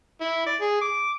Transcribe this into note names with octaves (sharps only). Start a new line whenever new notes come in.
E4
D5
G#4
D6